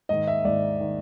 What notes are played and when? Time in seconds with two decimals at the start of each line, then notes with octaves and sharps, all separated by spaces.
0.09 G#2 D#3 D#5
0.27 E5
0.44 G#2 D#3 D5
0.80 D#3